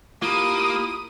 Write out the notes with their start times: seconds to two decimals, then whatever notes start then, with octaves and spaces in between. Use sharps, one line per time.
0.22 A#3 E4 F4 G4 A#5 B5 D#6